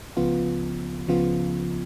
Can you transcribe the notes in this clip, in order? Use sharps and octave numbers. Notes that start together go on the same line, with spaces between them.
C#2 C#3 F3 B3 F4
C#2 C#3 F3 B3 F4